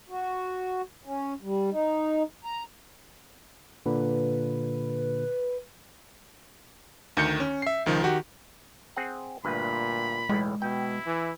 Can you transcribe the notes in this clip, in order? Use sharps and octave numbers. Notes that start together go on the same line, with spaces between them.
F#4
C#4
G3
D#4
A#5
A#2 D3 B4
D2 D#3 G6 C#7
C#4
E5 C7
C#2 D#3 F3
D#3 F#4 G4
C4 G#4 F#5
D2 G2 A#2 B4 B5
B1 E2 A2 G#3
B2 E4 G5
E3